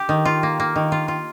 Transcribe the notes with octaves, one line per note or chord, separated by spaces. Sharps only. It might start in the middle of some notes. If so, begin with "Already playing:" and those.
Already playing: G4
D#3
F4
A#3
A#3
D#3
F4
F4